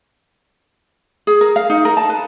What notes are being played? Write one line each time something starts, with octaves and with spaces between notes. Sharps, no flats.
G#4
A#4
F5
D#4
A#4
A5
B4